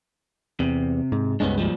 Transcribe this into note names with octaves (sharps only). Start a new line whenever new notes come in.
E2 C3
G#2
C#2 G2 G#3 B3 C#4 D4
A#2 F3 G3